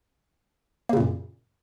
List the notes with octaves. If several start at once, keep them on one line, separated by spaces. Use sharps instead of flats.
F#2 A#2 C#3 A#3